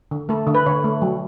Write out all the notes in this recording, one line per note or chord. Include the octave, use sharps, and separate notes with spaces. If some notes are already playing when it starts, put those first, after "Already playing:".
D3
A3 A4
D3
B4
D3 C#5
A3
F#3